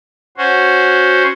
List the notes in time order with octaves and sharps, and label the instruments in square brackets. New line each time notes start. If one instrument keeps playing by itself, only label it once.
[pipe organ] C#4 F#4 C5